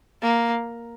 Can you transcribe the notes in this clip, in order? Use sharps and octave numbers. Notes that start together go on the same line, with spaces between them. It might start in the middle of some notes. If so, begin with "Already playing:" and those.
A#3